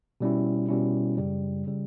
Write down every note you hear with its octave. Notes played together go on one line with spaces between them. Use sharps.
B2 G3 C#4 E4
B2 G3 C#4 E4
F#2 C#3 G3
C#3 G3